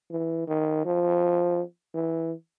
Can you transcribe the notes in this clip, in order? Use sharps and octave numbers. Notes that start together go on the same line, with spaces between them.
E3
D#3
F3
E3